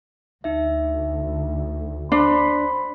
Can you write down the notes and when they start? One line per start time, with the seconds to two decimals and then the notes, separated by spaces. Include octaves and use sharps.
0.44 D2 D#4 E5
2.12 D4 C5 B5 C6